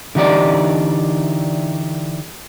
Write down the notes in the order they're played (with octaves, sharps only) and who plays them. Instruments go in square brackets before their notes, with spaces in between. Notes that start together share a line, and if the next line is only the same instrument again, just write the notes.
[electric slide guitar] D3 E3 D#4 G4 D5